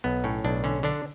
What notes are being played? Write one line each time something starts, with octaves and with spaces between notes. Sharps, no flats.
B1 B3
A2 C#4
B1 D4
D3 C#4
D3 D4